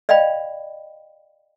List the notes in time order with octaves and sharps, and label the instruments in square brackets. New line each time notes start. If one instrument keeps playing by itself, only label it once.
[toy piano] D5 D#5 F5 G5 B5